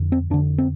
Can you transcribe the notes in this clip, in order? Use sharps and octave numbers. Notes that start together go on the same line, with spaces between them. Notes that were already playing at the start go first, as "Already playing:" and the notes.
Already playing: F2 D3
C4
F2 D3 D4
C4